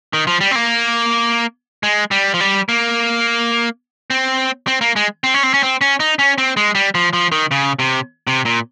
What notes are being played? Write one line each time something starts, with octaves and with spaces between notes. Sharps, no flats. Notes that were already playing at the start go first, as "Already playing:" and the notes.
D#3
F3
G3
C4
A#3
G#3
G3
F3
G3
A#3
C4
C4
A#3
G#3
C4
C#4
C4
C#4
C4
C#4
D#4
C#4
C4
G#3
G3
F3
F3
D#3
C#3
C3
C3
A#2